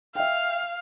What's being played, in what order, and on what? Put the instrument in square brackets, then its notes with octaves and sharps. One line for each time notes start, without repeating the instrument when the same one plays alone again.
[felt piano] E5 G5 [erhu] F5